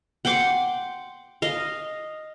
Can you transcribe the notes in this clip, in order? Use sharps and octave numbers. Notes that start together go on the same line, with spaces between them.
F#5 G5 C6 D6
D#5 F5